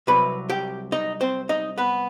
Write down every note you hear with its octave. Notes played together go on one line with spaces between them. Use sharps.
C2 C3 F#3 B4 B5
G4 G5
D#4 D#5
C4 C5
D#4 D#5
B3 B4